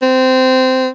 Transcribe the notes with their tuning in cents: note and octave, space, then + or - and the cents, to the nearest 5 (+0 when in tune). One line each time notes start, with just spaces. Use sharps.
C4 -15